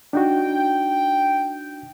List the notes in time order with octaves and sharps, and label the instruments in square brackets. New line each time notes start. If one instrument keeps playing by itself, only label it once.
[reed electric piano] D4 D#4 F#4 [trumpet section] G5